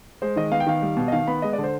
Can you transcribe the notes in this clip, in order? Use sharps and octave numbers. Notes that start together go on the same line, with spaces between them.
G#3 C5
D#3 D#5
B3 F5
G5
D#3 F5
G3
B2
D#5
D#3 F5
B3 B5
G#3 D#5
D5
D3
C5